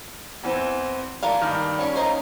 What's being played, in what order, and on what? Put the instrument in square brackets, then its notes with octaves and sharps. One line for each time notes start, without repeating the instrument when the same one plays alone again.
[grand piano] E2 E3 C4
[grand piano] E3 [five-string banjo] A#3 D4 F5
[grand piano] G2 D#3
[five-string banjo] G3 C#5 [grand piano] C#4
[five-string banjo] A#3 D#4 C5